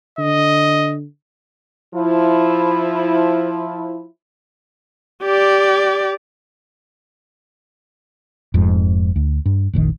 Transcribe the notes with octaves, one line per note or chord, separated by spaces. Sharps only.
D3 D#5
F3 E4
G4 D5
F1 F2 G#2
D2
G2
F1 A#1 C3 D#3